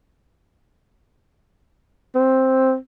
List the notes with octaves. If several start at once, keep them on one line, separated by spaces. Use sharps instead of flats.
C4